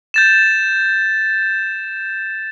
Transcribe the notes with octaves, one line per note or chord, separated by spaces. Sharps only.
G6 A6 E7